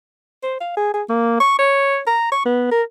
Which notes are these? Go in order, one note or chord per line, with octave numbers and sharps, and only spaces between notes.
C5
F5
G#4
G#4
A#3
C#6
C#5
A#5
C#6
B3
A#4